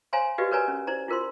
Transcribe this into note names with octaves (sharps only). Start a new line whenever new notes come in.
C5 C#5 F5 G#5 A#5 C6
F#4 G4 B4 D5 D#5 F5
A#4 B4 C#5 D5 G#5 A#5
C#4
E4 C5 D5 A#5
E4 F4 A#4 C5 C6